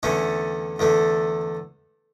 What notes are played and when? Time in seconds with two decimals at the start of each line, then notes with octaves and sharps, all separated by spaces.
0.03 E2 D3 A3 C#4
0.79 E2 D3 A3